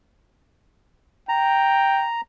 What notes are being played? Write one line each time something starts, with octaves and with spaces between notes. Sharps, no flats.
G5 A#5